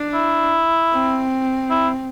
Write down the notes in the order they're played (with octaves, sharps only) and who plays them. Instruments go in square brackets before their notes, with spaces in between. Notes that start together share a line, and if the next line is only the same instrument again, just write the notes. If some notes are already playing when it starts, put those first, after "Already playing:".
Already playing: [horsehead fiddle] D4
[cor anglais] E4
[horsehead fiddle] C4
[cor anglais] E4